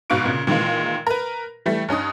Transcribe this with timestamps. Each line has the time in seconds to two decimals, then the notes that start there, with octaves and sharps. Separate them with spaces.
0.10 G1 G#2 B2 F5 C#6 D7
0.25 A#2 C#3
0.47 A#2 D#3 E3 G#3 A#3
1.07 A#4 B4
1.66 E3 G3 A3
1.89 G2 C#4 D#4 D#6